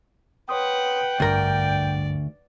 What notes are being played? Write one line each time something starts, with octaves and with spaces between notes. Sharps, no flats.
B4 C#5 F#5 G5 C6 D#6
A1 D2 G2 A#4 D5